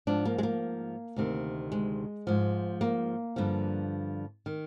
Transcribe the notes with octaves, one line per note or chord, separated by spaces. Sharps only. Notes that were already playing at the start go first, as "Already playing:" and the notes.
G#2 F3 D4
A#3
G#3
A#3
D2 C3 D#3
G#3
G#2 F3
A#3
G2 D3 F3
D#3